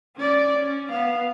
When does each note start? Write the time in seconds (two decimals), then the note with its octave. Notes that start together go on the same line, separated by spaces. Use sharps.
0.17 C#4 D5
0.56 C#4
0.89 B3 F5